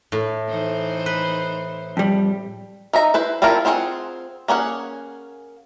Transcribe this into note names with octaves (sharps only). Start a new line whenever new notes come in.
A2
E3 D#4 C5
B4
F2 G3
D#4 E5 A#5
E4 B4 C5
A3 C4 E4 F4 A#4
C4 F4 G#4 C5 F#5
A#3 C#4 G#4 F#5